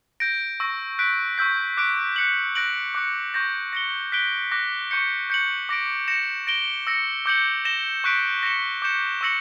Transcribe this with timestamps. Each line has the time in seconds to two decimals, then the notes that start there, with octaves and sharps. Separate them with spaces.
0.20 G6 A#6 D7
0.60 C#6 E6 A#6
0.99 F#6 B6 D7
1.38 C#6 E6 G6 B6
1.77 D6 F#6 B6 D7
2.16 F#6 C#7 F#7
2.55 F#6 A#6 D7 F#7
2.95 D6 F#6 C#7
3.34 C#6 G6 A#6
3.73 A#6 C#7 G7
4.12 F#6 B6 D7 G7
4.52 D6 F#6 A#6
4.91 C#6 G6 C#7
5.30 G6 C#7 F#7
5.69 D6 A#6 D7
6.08 A#6 C#7 E7
6.47 A#6 D7 G7
6.87 E6 A#6 C#7
7.26 D6 G6 C#7 F#7
7.65 A#6 E7 G7
8.04 C#6 F#6 B6 D7
8.43 A#6 C#7 E7 G7
8.82 D6 G6 C#7 E7
9.21 C#6 E6 A#6 C#7 F#7